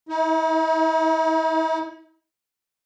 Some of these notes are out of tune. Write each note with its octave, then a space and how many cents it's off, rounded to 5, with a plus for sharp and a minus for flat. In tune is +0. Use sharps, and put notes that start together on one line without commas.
E4 -45